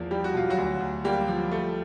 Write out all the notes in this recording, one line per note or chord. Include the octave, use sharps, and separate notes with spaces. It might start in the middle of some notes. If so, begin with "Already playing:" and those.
Already playing: E2 F3 A#3
G3 G4
F#4
B2 F4
F#3 F#4
D2
D2
G3 A#3 G4
F3
A3